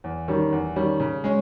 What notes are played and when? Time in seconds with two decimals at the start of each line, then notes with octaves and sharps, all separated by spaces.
0.04 E2
0.28 D#3 G3 C#4
0.52 E2
0.76 D#3 G3 C#4
1.00 C#3
1.24 G#3 C#4